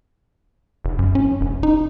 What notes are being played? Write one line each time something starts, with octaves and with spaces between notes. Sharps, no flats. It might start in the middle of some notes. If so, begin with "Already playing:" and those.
F1
F#2
C#4
F1
D#4